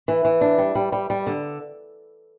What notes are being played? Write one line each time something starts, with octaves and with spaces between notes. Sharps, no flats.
E3
E3
D4
G3
G3
G3
G3
D3